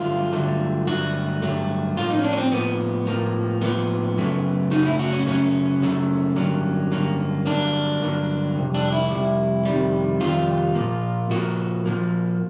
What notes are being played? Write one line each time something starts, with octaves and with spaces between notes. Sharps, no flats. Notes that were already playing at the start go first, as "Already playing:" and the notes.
Already playing: G2 D3 F#3 A3 F4
G2 D3 F#3 A3
G2 D3 F#3 A3 F#4
G2 D3 F#3 A3
A2 F3 A#3 F4
D#4
C#4
D4
C#4
C4
A2 F3 A#3 B3
A2 F3 A#3
A2 F3 A#3 B3
F#2 C#3 F#3 A3
F#2 C#3 F#3 A3 D#4
E4
F#4
C#4
F#2 C#3 F#3 A3 C#4
F#2 C#3 F#3 A3
G2 D3 F#3 A#3
G2 D3 F#3 A#3
G2 D3 F#3 A#3 D4
G2 D3 F#3 A#3
F2 C3 G3
D4
E4
F2 C3 G3
F2 C3 D#3 G3
F2 C3 D#3 G3 F4
A#2 F3 A#3
A#2 F3 A#3 F#4
A#2 F3 A#3